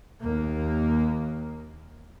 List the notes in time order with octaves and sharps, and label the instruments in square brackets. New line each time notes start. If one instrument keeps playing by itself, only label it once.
[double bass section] D#2 A#3